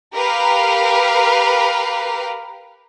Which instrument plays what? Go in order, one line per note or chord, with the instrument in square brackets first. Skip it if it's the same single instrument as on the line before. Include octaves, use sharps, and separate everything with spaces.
[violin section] G4 A#4 B4 F5